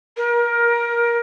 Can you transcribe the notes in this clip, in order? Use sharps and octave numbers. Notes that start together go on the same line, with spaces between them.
A#4